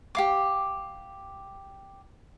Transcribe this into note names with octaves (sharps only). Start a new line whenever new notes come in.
G4 F5 D6